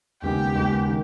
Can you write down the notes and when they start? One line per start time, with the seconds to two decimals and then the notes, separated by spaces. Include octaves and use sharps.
0.22 D#2 C#3 G#3 B3 D#4 G4
0.55 D#2 C#3 G#3 B3 D#4
0.88 D#3